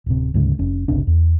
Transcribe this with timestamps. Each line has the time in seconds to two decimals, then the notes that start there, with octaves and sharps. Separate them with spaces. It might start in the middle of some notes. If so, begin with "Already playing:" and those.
0.06 D1 C3
0.34 D2 G#2 C#3
0.59 F1 C#4
0.88 G1 C#2 C3 D4
1.07 E2